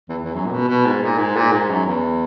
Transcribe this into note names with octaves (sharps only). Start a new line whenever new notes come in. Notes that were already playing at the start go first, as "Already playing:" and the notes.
E2
E2
F#2
A#2
B2
B2
G#2
A#2
G#2
A#2
G#2
F#2
E2